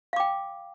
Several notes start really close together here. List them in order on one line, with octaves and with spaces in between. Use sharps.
F5 D6 G5